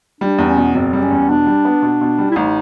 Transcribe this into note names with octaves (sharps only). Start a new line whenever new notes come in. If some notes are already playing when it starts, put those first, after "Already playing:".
G3 D4
E2
C#4
B2
F#1 C4
G3
C#4
E2
B2 D4
G3
B3
B2
B2
G3
E4
A1 D#4